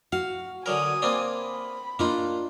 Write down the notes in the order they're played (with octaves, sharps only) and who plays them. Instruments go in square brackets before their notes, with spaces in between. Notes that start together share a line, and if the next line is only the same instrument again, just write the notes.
[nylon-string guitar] F#4 [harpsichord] F5
[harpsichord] D3 F#3 A#4 [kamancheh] G#5 D#6
[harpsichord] A#3 C4 D4
[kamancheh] B5
[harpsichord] A#3 D#4 [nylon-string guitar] D4 F4